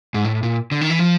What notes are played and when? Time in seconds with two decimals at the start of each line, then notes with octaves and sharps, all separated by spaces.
0.14 G#2
0.25 A2
0.43 A#2
0.71 D3
0.81 D#3
0.90 E3
0.99 F3